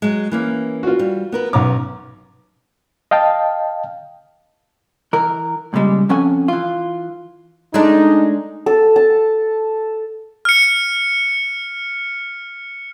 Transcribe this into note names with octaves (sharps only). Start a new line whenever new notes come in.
F#3 G#3
E3 A#3 C#4
F4 F#4
G3
B3 A#4 B4
B1 C#4 A#5 D6
D#5 F5 G5 A5
E3 A#4
G2 A#2 C#3 G3 G#3
F2 F3 C#4 A4 F#5 G#5
E3 F4
G#3 A3 D4 D#4
A4
A5
F6 C#7